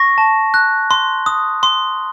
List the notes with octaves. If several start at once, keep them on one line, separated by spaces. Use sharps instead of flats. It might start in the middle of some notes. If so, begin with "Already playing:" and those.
Already playing: C#6 A#6
A5
F#6
C6
D#6
C6